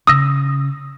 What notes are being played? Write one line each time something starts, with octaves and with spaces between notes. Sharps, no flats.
C#3 D#6 E6 A#6